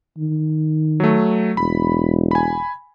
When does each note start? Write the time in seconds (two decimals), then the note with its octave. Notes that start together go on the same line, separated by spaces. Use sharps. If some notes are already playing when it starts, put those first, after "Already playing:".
0.18 D#3
1.00 F#3 A3
1.57 E1 B5
2.31 G#5 B5